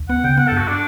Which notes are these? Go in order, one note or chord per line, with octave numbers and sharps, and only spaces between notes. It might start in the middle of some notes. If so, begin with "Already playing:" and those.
Already playing: D2
B3 F#5
C#3 G5
B3 F#5
A4
G2
F#4
D4